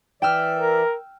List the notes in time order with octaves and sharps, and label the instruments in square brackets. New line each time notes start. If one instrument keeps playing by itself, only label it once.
[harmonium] E3 D5 E5 [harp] G5 E6 F6
[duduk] A#4